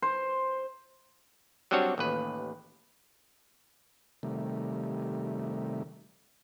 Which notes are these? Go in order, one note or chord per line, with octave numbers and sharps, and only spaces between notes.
C5
F#3 G3 C4 D4 F#4 C#5
A1 D#2 B4
C3 D#3 G3 A3